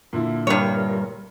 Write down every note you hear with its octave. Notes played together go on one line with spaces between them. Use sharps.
A#2 D3 E4
G2 G3 A#4 C#5